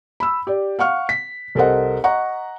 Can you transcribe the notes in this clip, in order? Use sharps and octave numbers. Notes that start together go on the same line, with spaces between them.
B5 E6
G4 D5
F5 F#5 C#6 F6
B6
C2 A4 A#4 C5 D#5 F#5
D#5 F#5 A#5 C#6